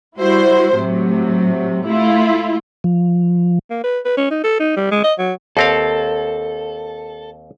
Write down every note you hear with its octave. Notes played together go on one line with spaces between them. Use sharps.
G3 E4 F#4 C5
A2 C3 F#3
A3 E4 F4
F3
A#3
B4
B4
C#4
D#4
A4
D#4
G3
G#3
D#5
F#3
D#2 C4 A4 F5